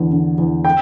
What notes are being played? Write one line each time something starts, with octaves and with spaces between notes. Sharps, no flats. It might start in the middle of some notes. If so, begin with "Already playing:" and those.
Already playing: E2 D3
D3
E2
G5